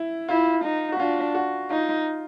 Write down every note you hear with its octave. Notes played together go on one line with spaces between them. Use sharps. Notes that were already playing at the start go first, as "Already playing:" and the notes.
Already playing: E4
E4 F4
D#4
F#4
D4 F4
F#4
D#4 F4